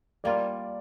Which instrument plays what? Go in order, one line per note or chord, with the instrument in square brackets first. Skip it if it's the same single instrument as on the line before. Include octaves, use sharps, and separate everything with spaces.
[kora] G3 A#3 F4 [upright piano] D5